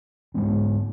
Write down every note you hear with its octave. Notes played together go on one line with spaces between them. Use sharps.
G#2 G#3 B3 D4